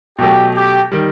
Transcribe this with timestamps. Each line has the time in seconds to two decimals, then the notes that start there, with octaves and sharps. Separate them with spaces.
0.19 B2 F#3 A3 G4
0.55 G4
0.92 D#3 G3